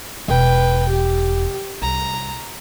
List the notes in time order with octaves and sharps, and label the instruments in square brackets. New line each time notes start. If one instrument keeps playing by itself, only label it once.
[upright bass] E1 [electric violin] B4 G5
[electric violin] G4
[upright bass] C2 [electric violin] A#5